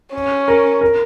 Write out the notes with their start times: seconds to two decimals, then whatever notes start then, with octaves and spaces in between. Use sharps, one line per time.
0.13 C#4
0.48 A#4
0.81 A#4